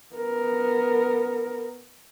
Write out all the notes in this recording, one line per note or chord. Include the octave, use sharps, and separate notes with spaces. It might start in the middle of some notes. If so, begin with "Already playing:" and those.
B3 A#4